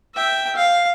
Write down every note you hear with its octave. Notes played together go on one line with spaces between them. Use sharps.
E5 G5
F5